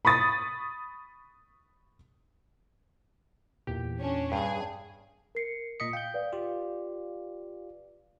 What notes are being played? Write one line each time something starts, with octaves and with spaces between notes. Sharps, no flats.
B5 C#6 D#6 A6
E2 A#2 G4
C#4 D4
G2 G#4 F5 G5
A#4 C7 C#7
A#2 D#5 D#6 B6 C#7
F5 G5 D#6 G6
B4 D5 F5
F4 G4